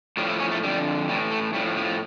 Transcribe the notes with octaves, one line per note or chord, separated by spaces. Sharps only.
A2 F3 G3
E4
C#4
A3
F2 D3 G3
A2 E3 G3
A3
A2 F3 G3
F3